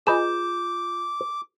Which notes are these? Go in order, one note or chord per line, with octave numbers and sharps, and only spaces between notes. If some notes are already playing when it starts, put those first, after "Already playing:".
F4 G#4 B4 D#5 D6 G6 E7